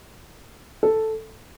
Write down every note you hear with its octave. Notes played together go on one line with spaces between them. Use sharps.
A4